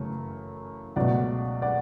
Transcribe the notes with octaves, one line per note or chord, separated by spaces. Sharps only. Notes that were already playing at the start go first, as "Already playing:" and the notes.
Already playing: F#2 C#3 E3 A3
C#2 B2 F#3 A3 D5 F#5
D5 F#5